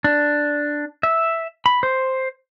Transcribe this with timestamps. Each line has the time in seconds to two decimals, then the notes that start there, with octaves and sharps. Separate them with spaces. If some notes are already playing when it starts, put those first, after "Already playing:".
0.04 D4
1.03 E5
1.66 B5
1.83 C5